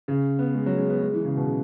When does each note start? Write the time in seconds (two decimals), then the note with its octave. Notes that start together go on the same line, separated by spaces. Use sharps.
0.08 C#3
0.39 B3
0.54 G#3
0.66 F#3
0.77 G#3
0.90 B3
1.02 G#3
1.14 E3
1.24 C#3
1.37 B2
1.48 C#3